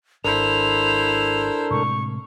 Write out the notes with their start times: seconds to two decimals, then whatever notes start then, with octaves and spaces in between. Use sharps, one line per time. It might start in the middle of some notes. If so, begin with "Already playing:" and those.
0.24 G#1 D4 E4 A4 A#4 C5 F7
1.71 A2 C3 G#3 C#6